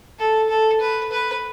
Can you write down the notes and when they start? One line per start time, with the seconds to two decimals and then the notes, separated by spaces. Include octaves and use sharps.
0.19 A4
0.50 A4
0.81 B4
1.12 B4